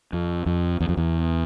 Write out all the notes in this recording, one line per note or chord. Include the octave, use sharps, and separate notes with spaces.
F2
F2
E2
F2
E2